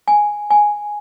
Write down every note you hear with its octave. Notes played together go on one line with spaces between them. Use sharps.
G#5
G#5